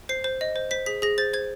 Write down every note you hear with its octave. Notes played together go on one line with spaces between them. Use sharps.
C5 C7
C5
D#5
C5
C5 B6
G#4 B6
G#4 A#6
C5 A6
C5 G#6